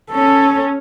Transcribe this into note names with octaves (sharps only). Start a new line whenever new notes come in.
C#4 A4